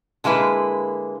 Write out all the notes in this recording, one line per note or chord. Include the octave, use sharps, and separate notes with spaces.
D3 G#3 A#3 E4 B4